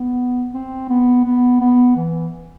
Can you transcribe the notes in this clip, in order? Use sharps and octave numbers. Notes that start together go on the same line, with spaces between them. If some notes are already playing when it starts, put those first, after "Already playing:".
Already playing: B3
C4
B3
B3
B3
E3